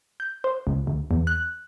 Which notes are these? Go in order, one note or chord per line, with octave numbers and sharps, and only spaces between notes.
G6
C5
C#2
D2
E2
F#6